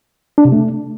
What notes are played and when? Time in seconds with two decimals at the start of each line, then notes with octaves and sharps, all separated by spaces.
0.38 D4
0.45 C3
0.52 A3